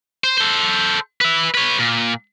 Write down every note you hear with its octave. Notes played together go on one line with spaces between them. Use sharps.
C5
A4 C5
B4 E5
B4 C#5
A#2